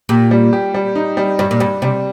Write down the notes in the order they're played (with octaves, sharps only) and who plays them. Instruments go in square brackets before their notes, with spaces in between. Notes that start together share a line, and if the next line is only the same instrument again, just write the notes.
[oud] A#2 [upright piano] G4
[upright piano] G3
G4
G3
D#4
G3
[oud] G2 [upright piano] G3
[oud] A#2
[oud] G2 [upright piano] G3
[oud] C3 [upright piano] G3